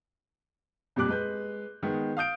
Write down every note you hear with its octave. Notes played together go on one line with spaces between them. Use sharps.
F2 A#2 G3 D6 F#6
G#3 B4 G6
D#3 G#3 B3
F5 D#6 G6 D7